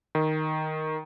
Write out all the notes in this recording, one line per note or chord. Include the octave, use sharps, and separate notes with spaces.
D#3